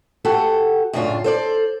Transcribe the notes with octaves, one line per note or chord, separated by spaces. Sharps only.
F#4 G4 A4 F#5
F#2 A2 C#3 D4 F4
A4 C5 D5